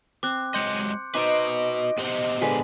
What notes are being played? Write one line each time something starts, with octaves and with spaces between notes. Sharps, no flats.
C4 D6 F#6
F#3 G#3 D#5 C6 G6 C#7
D#4 F#4 B4 C5 D#5 D6 D7
B3 G4 C5 F#5
D3 G#3 B4